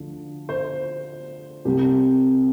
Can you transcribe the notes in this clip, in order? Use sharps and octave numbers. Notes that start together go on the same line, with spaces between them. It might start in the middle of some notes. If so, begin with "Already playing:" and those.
Already playing: D2 D3 F3
C5
C2 C3 G3 G4